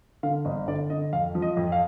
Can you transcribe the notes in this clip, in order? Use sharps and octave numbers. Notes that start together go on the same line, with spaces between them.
D3 F5
G1 D#5
D3 D5
D3 D#5
F2 F5
F3
D#5
F2
F5